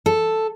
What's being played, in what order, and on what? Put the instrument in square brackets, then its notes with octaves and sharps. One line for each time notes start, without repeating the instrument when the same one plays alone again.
[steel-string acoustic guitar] A4